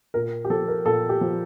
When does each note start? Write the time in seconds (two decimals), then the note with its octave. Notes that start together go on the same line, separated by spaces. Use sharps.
0.14 A#2 A#4
0.45 G4
0.50 F3 A4
0.68 A#4
0.85 A#2 A4
1.09 G4
1.21 F3